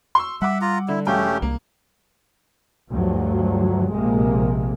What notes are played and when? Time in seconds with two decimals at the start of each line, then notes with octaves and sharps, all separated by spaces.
0.15 C6 C#6 E6
0.42 G3 E5 F#5 D6
0.62 F4 A#5
0.88 D3 E4
1.07 E1 A3 C#4 G4 F5 G5
1.42 C2 A#3
2.90 D2 G2 F3 F#3
3.92 A#1 C3 G#3 A#3